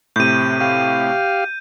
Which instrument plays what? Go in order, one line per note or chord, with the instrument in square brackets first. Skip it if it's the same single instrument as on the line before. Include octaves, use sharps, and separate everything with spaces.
[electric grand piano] A2 C3 [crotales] G6 D#7
[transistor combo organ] G4 F5